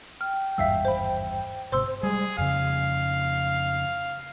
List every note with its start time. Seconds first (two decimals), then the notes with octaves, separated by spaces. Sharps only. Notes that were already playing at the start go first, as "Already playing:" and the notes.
0.21 G5 F6
0.58 G#1 E2 G2 E5 F5 E6
0.85 C5 B5
1.72 G#1 C3 C5 C6 E6
2.03 G3 G#3 G#4
2.38 F2 C#3 F5